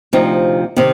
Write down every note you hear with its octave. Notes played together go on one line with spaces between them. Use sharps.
D2 C3 F3 C4 D#4
C3 D#3